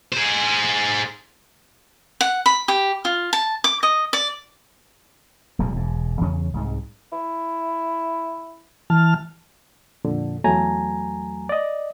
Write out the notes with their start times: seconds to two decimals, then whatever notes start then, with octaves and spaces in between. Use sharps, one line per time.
0.12 G#4 C5
2.21 F#5
2.46 B5
2.68 G4
3.05 F4
3.33 A5
3.64 D6
3.83 D#5
4.13 D5
5.59 D1 B1 E2 G#3
5.74 E1 G#2
6.21 E2 C#3 C#4
6.53 C2 G#2 G#3
7.12 E4
8.90 E3 A5 F6
10.04 F2 A#2 D3
10.44 E2 F#3 A3 G#5 A#5
11.49 D5 D#5